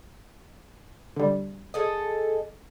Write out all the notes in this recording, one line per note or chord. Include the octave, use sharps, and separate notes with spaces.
D3 G3
G#4 A4 D#5